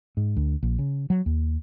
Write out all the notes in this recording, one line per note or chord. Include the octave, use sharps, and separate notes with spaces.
G#2
D2
A#1
C#3
F#3
D#2